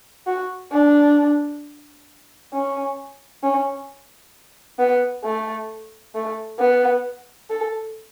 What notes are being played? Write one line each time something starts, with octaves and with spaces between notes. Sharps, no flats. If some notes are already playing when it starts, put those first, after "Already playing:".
F#4
D4
C#4
C#4
B3
A3
A3
B3
A4